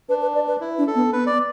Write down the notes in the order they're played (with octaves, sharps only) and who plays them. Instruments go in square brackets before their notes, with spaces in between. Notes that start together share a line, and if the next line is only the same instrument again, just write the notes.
[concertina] D4 [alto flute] B4
[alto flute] B4
D5
B4
[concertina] E4
[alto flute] D4
[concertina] A4
[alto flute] B3
[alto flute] B3 [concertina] B4
[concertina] D5